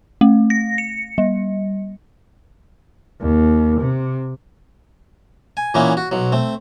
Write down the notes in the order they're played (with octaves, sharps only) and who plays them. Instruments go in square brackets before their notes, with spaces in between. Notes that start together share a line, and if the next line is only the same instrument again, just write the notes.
[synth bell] A3
A#6
C#7
G3
[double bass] D#2
C3
[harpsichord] G#5
A#2 E3 A#3 B3 C#4 E4
F#4
B1 F#3
A3 C4